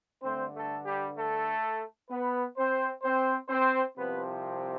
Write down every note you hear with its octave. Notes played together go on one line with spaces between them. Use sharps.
G2 D3 A3 C4 C5
A3 A4
G3 G4
A3 A4
B3 B4
C4 C5
C4 C5
C4 C5
C2 C3 F3 B3 C4 B4